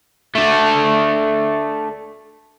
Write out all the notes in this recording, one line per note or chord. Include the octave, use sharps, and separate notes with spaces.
A3 D4